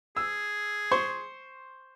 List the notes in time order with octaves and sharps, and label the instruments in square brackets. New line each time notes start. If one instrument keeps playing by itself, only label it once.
[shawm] G#4 [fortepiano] E6
[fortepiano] C5 C6 C#6